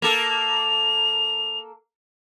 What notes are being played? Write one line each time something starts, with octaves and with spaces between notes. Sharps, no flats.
A#3 A4 F7